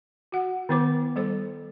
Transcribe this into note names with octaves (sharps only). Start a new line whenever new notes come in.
F#4 F#5
D#3 B3 E4 B4 C5 D6
G3 A4 C5